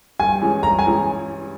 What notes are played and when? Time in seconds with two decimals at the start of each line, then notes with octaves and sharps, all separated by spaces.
0.20 G2 G#5
0.41 E3 G#3 C#4
0.63 G2 A#5
0.79 G#5
0.85 E3 G#3 C#4